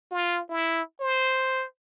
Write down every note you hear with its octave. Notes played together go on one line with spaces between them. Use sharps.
F4
E4
C5